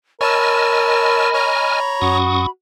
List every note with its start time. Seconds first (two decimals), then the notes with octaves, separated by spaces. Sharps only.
0.21 A#4 C#5 D#5 G#5 A5 B5 E6 F6
1.34 C#5 A#5
2.02 F#2 F#4 C#6 D#6